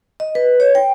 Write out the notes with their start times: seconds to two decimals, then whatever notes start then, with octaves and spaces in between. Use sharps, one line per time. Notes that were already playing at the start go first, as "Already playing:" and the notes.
0.20 D#5
0.35 B4
0.60 C#5
0.75 G5